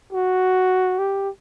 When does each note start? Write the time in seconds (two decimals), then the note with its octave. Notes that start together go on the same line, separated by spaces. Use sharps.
0.13 F#4
0.99 G4